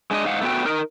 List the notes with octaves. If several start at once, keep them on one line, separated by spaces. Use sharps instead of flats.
G#3 D4 D5 D#5
G#2 D#4 F5 F#5
A3 B3 F#4 G5
D#4 A#4